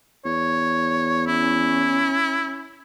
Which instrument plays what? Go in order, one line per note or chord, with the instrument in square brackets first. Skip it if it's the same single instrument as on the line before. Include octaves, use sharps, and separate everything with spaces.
[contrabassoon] E2 [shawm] C#5
[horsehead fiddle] C#4 [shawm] E4